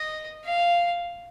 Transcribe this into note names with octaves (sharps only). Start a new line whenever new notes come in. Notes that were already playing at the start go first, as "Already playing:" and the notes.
Already playing: D#5
F5